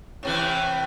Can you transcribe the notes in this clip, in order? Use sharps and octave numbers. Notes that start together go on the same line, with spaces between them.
A2 C3 E3